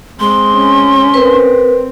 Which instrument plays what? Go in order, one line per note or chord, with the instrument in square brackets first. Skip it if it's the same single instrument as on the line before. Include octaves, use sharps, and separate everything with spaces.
[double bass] G#3 C4 [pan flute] C6
[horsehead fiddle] C#4
[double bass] C4 [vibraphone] A#4 B4